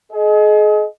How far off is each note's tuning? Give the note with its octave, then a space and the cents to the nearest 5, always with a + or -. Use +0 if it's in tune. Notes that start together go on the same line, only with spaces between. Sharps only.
G#4 +35 D#5 +0